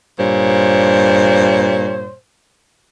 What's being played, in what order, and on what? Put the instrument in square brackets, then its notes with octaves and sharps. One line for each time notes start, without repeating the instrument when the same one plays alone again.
[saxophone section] G2 A#2 C5 C#5